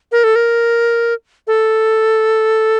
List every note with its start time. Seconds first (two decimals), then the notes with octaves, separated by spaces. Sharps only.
0.12 A#4
0.24 A4
0.36 A#4
1.47 A4